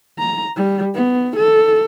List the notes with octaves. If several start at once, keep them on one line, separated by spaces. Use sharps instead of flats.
A#5
G3
B3
A4